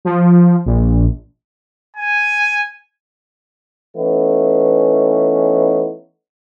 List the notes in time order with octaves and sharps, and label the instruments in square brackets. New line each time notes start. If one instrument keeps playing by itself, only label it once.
[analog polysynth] F3
A#1
[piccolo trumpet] G#5
[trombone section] E3 A3 B3 C#4 D#4